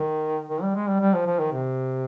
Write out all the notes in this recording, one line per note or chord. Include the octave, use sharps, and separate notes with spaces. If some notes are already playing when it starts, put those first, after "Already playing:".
Already playing: D#3
D#3
G3
G#3
G3
G3
F3
F3
D#3
C3